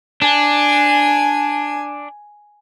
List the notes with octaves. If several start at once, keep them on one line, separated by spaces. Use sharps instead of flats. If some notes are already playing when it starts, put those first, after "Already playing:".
D4 G#5